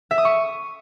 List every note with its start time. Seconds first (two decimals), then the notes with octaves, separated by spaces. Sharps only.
0.11 E5
0.18 D#6
0.25 C#6